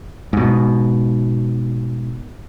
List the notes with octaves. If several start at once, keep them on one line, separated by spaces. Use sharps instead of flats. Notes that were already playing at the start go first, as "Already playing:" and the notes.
G#2 B2